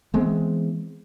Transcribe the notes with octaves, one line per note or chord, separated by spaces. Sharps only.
E3 G#3 B3 C4